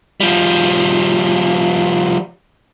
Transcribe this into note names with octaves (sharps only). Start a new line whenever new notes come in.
F3 G3